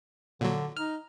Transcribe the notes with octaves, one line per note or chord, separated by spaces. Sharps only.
A#2 D3 F#3
D#4 F6